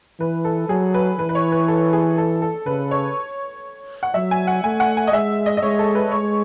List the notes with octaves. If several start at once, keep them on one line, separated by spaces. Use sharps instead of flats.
E3 B4
A4
F#3 G#4
B4
E3 B4
B4
C#5
B4
A4
G#4
A4
A4
C#3 B4
C#5
F#5
F#3 E5
G#5
F#5
A3 G#5
F#5
G#5
D#5
G#3 E5
D#5
D#5
G#3 C#5
A4
B4
G#3 C#5